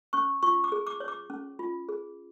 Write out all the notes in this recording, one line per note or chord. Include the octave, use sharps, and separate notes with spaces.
C#4 C#6
F4 C#6
D6
G#4
D6
C#5
D6
C#4
F4
G#4